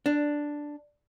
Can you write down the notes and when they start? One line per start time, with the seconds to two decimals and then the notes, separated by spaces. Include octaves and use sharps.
0.06 D4